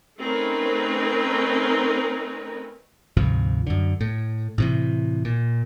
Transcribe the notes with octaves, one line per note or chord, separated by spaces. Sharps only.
A3 C4 C#4 D#4 A#4 B4
D2 G#2 C3 F3
F#2 D3
A2
A2 C3 E3
A#2